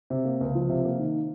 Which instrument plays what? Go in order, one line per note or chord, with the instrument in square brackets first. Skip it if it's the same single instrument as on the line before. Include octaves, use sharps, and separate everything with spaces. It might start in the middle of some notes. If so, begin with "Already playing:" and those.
[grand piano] C3
A#3
C#2
F3
C3
A#3
D#3